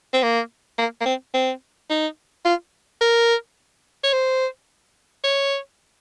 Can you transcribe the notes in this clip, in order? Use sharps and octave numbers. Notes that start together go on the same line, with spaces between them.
C4
A#3
A#3
A#3
C4
C4
D#4
F4
A#4
C#5
C5
C#5